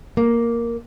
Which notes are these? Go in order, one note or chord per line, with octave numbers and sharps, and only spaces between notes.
A#3